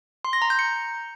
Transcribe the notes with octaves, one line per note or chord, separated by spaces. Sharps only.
C6
A#6
A#5
G6
C#7